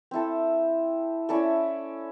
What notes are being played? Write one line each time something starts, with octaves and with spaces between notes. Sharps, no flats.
C4 E4 A4
C#4 E4 A4 D5